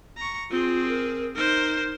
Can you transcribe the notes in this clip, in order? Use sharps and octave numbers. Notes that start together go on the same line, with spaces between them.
A#5 C#6
C4 F4 G#4
A#4
D#4 A#4 C5